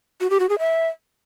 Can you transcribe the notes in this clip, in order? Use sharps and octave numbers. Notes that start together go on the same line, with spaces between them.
F#4
G4
F#4
G#4
E5